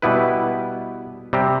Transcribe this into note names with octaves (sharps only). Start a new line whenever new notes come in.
B2 G3 B3 E4 B4
C3 G3 C4 G4